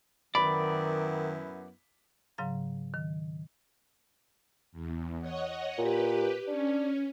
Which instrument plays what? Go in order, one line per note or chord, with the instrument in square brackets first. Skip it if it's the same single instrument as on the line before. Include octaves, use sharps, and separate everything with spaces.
[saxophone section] F#2 B3 E4 [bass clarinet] D#3 [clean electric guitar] D5 [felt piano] B5
[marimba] G#2 C#3 F#3 F5 A#5
D#3
[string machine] E2
C#5 D#5 F#5
[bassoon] A#2 [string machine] G4 B4
[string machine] C#4 [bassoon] D4